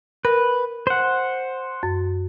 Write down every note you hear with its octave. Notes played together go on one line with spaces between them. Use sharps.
A#4 B4
C5 F#5
F#2